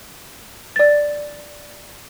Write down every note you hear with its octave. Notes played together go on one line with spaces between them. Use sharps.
D5 A6